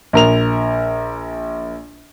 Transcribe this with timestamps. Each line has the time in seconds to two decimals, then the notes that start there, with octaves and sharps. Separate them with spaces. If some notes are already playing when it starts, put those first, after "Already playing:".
0.13 A#1 A#4 F7